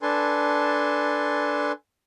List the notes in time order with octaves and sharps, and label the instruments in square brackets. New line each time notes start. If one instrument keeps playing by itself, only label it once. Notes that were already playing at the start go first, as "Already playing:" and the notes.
[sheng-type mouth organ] D4 A4 B4 G#5 A5 C6